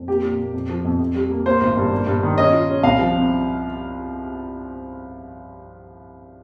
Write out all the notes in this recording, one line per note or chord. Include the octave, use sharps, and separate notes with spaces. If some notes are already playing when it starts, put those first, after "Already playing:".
Already playing: F2
A#3 G4
A#2
A#3
F2
F3
F2
F2
G3
A#3
A#3 C5
G#1
G2
A#3
G2
D#3
C#4 D#5
F4
C#4
C2 F5
F3
C4